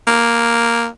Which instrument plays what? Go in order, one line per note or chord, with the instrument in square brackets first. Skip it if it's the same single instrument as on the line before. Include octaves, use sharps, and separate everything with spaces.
[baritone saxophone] A#3